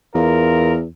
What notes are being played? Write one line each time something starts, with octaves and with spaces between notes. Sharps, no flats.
E2 F4 A#4